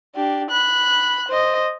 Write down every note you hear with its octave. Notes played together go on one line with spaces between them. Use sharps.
D4 G4
B5 F#6
C5 D#5